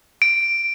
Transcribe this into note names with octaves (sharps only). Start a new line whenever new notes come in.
D7